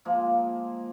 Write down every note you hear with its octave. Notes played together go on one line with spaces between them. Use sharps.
F3 G#3 A#3